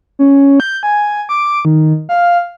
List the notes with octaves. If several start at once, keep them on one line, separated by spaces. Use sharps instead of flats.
C#4
G6
G#5
D6
D#3
F5